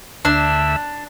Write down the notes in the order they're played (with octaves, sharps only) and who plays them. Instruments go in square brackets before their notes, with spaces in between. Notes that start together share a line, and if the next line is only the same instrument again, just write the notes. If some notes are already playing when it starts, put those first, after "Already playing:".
[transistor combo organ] D2 E5 [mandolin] D4